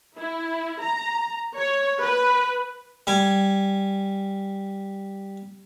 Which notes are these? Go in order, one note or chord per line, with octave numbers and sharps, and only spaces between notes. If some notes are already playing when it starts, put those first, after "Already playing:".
E4
A#5
C#5
B4
G3 G#5